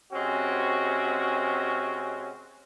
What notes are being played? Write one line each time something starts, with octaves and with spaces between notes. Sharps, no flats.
C3 G#3 C4 C#4 F#4